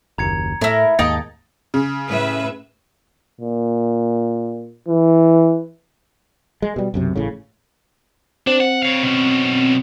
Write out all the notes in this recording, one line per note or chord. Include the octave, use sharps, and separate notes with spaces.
F#1 D#2 A#5 G#6 C#7
A2 A3 E4 A#4
D#2 G#2 A#3 D#4 G5 A5 A6
C#3
A2 B4 E5
A#2
E3
G#3
B2 G3
B1 F#2 C3
A1 A2 C#3
C4 D4
F#5
C#5 F5
B2 C#4